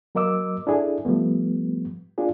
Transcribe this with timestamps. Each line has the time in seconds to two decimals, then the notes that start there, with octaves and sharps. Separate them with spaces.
0.15 F#3 A#3 A#4 D#5 D6 E6
0.67 D4 E4 G#4 A4
1.05 F3 G3 A3 B3
2.18 A#3 D4 F4 G#4